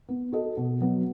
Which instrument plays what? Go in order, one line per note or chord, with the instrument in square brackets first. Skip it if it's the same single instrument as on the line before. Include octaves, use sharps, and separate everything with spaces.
[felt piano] B3
F#4 A4 D#5
B2
F#3 B3